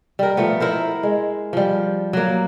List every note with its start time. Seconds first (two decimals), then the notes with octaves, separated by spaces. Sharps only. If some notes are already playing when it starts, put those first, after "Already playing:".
0.19 G3 A#4
0.37 F3 A3 B3
0.60 E4 A#4 C5
1.03 G#3
1.53 F3 G3
2.13 F#3 A#3